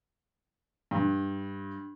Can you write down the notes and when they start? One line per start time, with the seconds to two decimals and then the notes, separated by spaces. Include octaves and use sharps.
0.91 G2